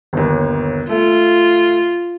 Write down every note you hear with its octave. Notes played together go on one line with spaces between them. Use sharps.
G1 D#2
A3 F4